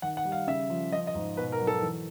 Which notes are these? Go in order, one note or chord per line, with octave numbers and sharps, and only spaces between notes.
D#3 F#5
F#5
G3
F5
C#3 E5
F3
F3 D#5
D#5
G#2
B2 B4
A#4
F#3
A4
E3